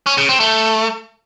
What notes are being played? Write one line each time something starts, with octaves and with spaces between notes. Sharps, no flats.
C#4
C#3
C4
A3